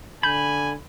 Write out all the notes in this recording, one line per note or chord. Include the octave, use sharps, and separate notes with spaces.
D3 G#5 B5 G6